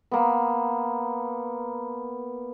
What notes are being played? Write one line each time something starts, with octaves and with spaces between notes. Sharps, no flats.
A#3 B3